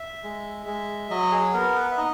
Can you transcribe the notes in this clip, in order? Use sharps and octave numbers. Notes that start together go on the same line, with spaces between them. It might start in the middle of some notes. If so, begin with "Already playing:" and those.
Already playing: E5
G#3
G#3
F#3 D#5
G#4
B3 A#4
B4
E5
D#4 D#5